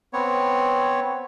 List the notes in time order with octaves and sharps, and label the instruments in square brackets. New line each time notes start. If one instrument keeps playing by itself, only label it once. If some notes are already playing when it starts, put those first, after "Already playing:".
[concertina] B3 C4 C#5